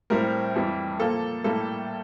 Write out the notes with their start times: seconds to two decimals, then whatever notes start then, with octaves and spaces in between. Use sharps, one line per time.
0.10 A2 G3 C4 A#4
0.55 F2 E3 G3
0.99 A#2 F3 A#3 A4
1.44 A2 G3 A#3 A4